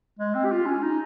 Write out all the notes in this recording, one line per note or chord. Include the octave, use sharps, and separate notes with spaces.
G#3
C4
G4
F4
C#4
D#4